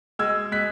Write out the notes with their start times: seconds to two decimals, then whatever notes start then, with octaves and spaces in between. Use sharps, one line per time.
0.19 G#3 E6 G#6
0.52 G#3 F#6 B6